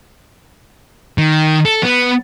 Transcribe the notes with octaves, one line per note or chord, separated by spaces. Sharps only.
D#3
A4
B3